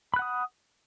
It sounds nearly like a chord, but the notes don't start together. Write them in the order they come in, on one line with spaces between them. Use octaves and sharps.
B5 F#6 F#5 D#6